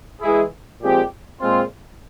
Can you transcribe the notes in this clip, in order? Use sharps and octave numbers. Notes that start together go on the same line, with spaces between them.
E3 G#3 E4 G#4
A#2 F3 G#3 C4 G4
A#2 G#3 C4 F4